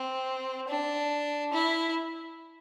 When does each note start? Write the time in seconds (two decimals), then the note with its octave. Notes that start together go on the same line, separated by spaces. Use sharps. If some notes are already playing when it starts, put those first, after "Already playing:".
Already playing: C4
0.68 D4
1.53 E4